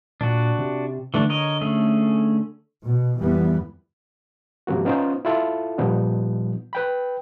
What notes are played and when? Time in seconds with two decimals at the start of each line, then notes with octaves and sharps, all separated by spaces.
0.21 A#2 D4 F#4
0.59 C3
1.14 D3 E3 A3 D4
1.30 A#4 C#5 D#5
1.61 A3 C#4 G#4
2.84 B2
3.18 F2 E3 G3 B3
4.67 G#2 C3 F3 A#3 F#4
4.85 B3 C#4 D#4 F4 C5
5.25 E4 F4 A4
5.78 A#2 F3 G3 B3 D#4
6.73 B4 G5 B5